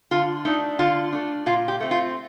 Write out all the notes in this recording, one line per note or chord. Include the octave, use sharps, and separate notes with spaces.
D3 F4
A3 D4 D#4
D3 F4
A3 D4
A#2 F4
G4
A3 C4
F4